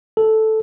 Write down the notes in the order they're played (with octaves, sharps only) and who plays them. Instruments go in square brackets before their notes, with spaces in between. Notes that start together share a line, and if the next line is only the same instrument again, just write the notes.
[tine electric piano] A4